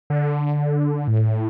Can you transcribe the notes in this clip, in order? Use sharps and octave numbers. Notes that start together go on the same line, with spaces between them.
D3
A2